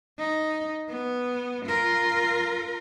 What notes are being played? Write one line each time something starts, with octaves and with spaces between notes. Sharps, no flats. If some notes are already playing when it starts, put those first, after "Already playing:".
D#4
B3
F4 A#4